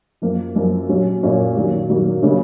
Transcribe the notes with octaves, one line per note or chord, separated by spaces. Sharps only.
F#2 F3 A#3
F#2 F3 A#3
A#2 F#3 C#4
A#2 F#3 C#4
D#3 F#3 A#3
D#3 F#3 A#3
C#3 F#3 A#3 C#4